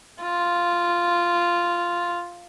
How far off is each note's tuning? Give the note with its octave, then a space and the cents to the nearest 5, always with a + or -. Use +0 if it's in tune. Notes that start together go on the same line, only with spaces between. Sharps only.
F4 -5